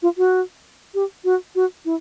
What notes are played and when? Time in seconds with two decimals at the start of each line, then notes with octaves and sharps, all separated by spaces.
0.03 F4
0.18 F#4
0.95 G4
1.25 F#4
1.55 F#4
1.85 E4